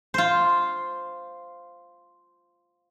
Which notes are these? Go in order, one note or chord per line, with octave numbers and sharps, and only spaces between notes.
F4 C5